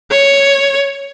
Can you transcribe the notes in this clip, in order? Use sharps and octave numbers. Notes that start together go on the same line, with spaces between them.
C#5